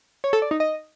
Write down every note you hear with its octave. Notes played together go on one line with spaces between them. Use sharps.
C#5
A4
D5
D#4
D#5